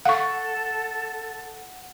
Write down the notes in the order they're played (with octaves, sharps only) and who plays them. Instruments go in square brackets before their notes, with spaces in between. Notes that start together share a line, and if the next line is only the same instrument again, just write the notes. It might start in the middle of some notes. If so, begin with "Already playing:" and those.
[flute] A4 [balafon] F5 C#6 [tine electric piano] F#5